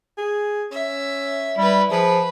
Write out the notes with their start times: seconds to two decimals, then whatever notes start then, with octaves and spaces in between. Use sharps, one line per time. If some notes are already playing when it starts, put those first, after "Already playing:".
0.17 G#4
0.72 C#4 E5
1.58 G3 E4 B4
1.91 F3 G#4 B4